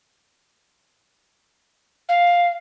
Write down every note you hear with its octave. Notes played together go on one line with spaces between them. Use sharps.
F5